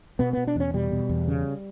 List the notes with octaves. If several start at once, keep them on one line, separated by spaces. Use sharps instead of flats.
B2 B3
B2 B3
D4
E2 C#4
B2 G3
B2
E2
C#3